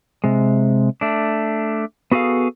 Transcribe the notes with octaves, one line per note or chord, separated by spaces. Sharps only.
C3 G#3
A3 D4
B3 F#4 G#4 A4 F5